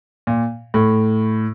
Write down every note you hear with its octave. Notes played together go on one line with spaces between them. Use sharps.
A#2
A2